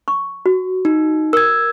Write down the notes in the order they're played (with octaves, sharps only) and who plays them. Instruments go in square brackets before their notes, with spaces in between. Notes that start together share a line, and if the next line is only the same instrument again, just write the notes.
[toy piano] C#6
F#4
[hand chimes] D#4
[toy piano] A#4 [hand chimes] E6 G#6